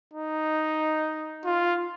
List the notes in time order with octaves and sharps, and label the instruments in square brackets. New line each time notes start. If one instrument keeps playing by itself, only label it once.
[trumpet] D#4
F4